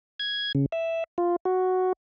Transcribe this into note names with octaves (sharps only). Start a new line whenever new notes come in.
G#6
C#3
E5
F4
F#4